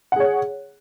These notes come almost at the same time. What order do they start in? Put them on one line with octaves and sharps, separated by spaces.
F#5 G#4 C#5